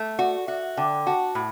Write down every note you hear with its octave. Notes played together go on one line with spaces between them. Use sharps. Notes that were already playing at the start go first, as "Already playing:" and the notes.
Already playing: A3
F#4 D5
F#4 E5
D3 G5
F#4 A5
A2 B5